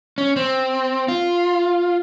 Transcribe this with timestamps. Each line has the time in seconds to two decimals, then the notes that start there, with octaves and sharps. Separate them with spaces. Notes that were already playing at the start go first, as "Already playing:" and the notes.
0.18 C#4
0.36 C4
1.08 F4